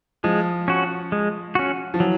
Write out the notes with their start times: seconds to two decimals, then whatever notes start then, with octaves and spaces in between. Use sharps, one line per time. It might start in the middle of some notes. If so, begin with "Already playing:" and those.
0.24 F3 G#3
0.68 C#4 F#4
1.12 G#3
1.55 C#4 F#4
1.94 F3
2.00 E3 F#3